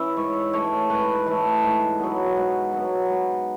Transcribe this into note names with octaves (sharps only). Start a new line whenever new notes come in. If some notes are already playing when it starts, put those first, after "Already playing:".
Already playing: E3 C#4 E4
G#2 C#5
E3 A3 C#5
G#2 B4
E3 A3
G#2
F#3 B3
G#2
F#3 B3
G#2